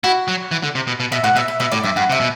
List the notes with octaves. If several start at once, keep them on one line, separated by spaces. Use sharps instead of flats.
E4 F#4
F#3
E3
D3
C3
B2
B2
B2 E5
A2 F#5
B2 E5
E5
B2 E5
A2 D5
G2 E5
G2 F#5
C3 E5
B2